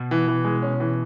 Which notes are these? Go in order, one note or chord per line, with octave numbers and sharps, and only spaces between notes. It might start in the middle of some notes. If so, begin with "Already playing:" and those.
Already playing: B2
E3
E3
G#3
C#4
E3